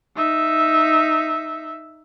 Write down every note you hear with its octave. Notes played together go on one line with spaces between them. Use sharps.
D#4 E5